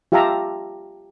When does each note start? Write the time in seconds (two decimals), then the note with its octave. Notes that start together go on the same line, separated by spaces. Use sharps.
0.12 F4 G4 E5 F5 A5 A#5